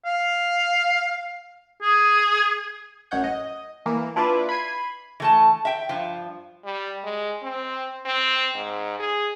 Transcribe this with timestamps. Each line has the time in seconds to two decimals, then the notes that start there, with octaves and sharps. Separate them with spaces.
0.05 F5
1.82 G#4
3.11 A1 F#2 C#5 F#5 G6
3.24 D#5
3.86 E3 A#3
4.16 D4 E4 F4 B4 D5
4.49 B5 G#6 C7 D#7
5.20 E3 A3 A5
5.65 E5 G5
5.89 G2 F3
6.65 G3
7.04 G#3
7.43 C4
8.05 C4
8.55 G#2
8.99 G#4